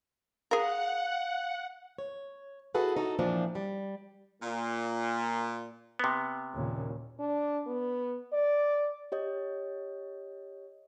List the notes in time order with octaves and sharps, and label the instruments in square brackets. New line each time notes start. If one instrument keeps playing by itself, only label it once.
[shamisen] G#4 A#4 [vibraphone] F5 [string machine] F#5
[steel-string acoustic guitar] C#5
E4 F#4 G#4 A4 B4 F#5
D#4 F#4 A4
A#2 E3 F3 C4 D4
G3
[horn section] A#2
[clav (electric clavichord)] C3 B3
[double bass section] D#2 A#2 C#3
[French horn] D4
B3
D5
[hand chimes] G4 C#5 D#5